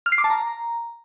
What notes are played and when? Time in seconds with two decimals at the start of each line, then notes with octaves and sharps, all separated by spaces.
0.06 F6
0.12 C7
0.18 D6
0.24 A5
0.30 A#5